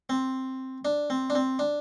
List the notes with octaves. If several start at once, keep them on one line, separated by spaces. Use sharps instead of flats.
C4
D4
C4
D4
C4
D4